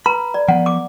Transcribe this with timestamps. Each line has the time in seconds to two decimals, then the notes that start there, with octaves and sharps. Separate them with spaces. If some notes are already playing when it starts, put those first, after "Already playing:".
0.06 B4 A#5 B5
0.34 D5
0.48 F3 B3 F#5
0.66 D6